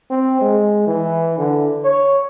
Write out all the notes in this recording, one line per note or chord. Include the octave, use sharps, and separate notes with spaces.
C4
G#3
E3
D3
C#5